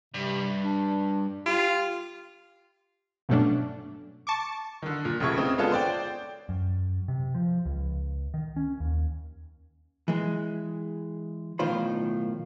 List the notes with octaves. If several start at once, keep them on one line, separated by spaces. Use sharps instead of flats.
G2 C3
D4
F4 G4
G2 B2 F#3 A3 C#4 D4
A5 C#6 D6
D3 D#3
A#2
F1 C#3 E5 C#6 G#6
C#3 C4 D#4
G#3 B3 C#4 D4 F4 A4
C5 D5 G5
F#2
C3
F3
C#2
D#3
C#4
D#2
E3 G#3
B1 A2 D#3 F4 C5 B5